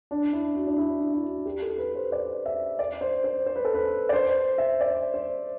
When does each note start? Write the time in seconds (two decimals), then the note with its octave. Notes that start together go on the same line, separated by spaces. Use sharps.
0.11 D4
0.33 E4
0.55 F#4
0.67 D4
0.78 E4
1.01 E4
1.14 E4
1.23 F#4
1.46 G4
1.62 A4
1.78 B4
1.95 C5
2.12 D5
2.46 E5
2.79 D5
3.01 C5
3.24 C5
3.46 C5
3.56 B4
3.65 A4
3.74 B4
4.09 D5
4.13 C5
4.58 E5
4.81 D5
5.14 C5